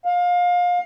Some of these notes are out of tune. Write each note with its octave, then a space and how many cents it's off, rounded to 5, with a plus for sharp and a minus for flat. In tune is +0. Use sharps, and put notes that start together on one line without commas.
F5 +25